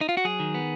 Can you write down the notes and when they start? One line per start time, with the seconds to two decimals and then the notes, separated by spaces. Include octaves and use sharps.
0.01 D#4
0.09 F4
0.17 F#4
0.25 F#3 G#4
0.40 D#3
0.54 B3